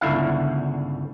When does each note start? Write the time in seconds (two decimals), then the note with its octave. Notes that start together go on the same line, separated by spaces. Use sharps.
0.01 G1 C#2 D3 E4 F5